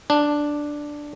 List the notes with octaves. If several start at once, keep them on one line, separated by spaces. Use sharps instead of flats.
D4